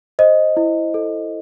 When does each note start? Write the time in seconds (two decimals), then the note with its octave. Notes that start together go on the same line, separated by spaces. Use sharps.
0.19 C5 D#5
0.57 E4
0.94 A4